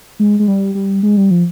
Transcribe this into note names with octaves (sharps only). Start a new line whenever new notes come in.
G#3
G#3
G3
G3
G#3
G3
F3